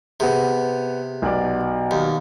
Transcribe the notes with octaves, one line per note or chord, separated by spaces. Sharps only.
C3 B3 G#4
B1 B2 D5
D#2